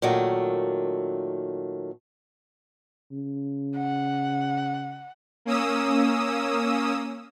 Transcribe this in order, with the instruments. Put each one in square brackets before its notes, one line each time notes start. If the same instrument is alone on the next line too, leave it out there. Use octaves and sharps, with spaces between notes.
[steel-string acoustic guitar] A#2 D#3 F#3 A3
[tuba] C#3
[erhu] F#5
[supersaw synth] A#3 C#4 D#6 E6